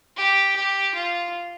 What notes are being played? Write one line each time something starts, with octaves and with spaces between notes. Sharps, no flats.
G4
G4
F4